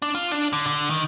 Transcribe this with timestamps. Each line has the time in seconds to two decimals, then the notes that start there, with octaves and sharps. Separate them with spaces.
0.02 D4
0.15 F4
0.32 D4
0.53 D3
0.66 D3
0.90 D#3